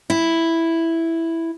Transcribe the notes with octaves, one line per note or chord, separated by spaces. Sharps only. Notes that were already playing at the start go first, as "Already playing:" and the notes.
E4